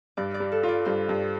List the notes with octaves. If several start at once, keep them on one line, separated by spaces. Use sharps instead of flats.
G2 D5
D5
G3
A4
F4 D5
G2 C5
G2